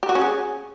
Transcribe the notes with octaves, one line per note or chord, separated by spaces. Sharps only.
G4
F#4
C#4
G#4